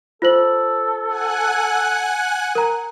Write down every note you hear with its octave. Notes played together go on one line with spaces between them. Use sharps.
F4 A4 C5 F#7
F#5 G#5 F#6
A#4 A#5